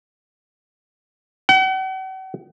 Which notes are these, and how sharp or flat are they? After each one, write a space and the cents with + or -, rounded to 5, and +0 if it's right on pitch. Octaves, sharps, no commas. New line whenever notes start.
F#5 +45